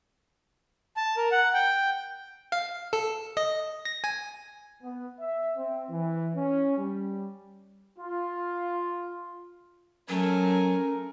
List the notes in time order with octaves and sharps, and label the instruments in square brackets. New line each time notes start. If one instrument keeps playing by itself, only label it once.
[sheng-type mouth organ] A5
A#4
F#5
G5
[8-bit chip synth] F5
A4
D#5
A#6
G#5
[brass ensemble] B3
E5
C4
E3
C#4
G3
F4
[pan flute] F#3 [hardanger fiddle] A3 G#5 [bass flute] C#4 [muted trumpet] A#4